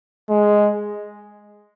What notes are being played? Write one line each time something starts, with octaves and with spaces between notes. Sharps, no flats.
G#3